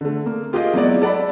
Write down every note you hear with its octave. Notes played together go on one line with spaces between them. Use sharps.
D3 A3
A#3
F4 G4 G#4 A#4 D#5 F5
F#3 G#3 B3 E4 F#4 D5
A4 D5 F#5 A5 B5